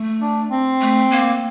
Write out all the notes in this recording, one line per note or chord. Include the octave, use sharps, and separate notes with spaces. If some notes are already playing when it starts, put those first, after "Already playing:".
Already playing: A3
D4
C4
A3
A#3